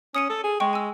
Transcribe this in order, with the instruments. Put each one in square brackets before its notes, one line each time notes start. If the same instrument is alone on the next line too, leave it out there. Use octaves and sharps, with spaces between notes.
[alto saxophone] C#4 [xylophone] D#6 C#7 D#7
[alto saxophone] A4
G#4
[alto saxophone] G#3 [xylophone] G5 C#6
[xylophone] G#5 E6